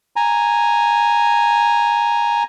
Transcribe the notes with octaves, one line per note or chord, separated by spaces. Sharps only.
G#5 A#5